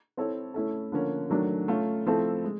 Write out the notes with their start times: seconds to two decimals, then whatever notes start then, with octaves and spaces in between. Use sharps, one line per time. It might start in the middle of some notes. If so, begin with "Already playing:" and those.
0.17 C4 E4 A4 C#5
0.54 A3 C#4 E4 A4
0.92 D3 F3 A#3 C#4
1.30 D#3 F#3 A3 D4
1.68 A3 C#4 F4
2.06 F3 A3 C4 E4 A4
2.44 G#3